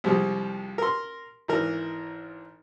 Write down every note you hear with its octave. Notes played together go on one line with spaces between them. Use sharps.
C2 F3 G3 G#3
A#4 C6
G#1 E3 A#4